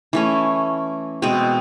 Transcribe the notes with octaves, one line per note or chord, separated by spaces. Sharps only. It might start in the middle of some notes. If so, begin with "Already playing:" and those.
E3 A3 C#4
B2 G#3 C4